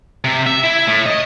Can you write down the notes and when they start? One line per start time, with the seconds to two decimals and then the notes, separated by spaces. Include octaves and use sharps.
0.24 C3
0.47 E5
0.64 E4
0.88 A2
1.06 D#5